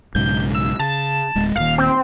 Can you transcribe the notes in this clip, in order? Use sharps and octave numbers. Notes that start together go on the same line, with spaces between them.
B1 G#2 C#3 G6
E6
C#3 A5
D1 G#3
D#1 D#2 F5
C4